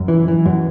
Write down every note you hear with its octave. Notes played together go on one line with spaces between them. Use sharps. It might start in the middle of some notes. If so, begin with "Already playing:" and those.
Already playing: F#2
E3
E3
F#2